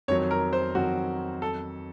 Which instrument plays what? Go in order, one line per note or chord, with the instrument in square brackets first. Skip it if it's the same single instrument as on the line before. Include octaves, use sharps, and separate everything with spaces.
[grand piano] F2 D#3 F#3 [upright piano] C#5
[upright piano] A#4
C5
[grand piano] F2 D#3 F#3 [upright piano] F#4
[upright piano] A4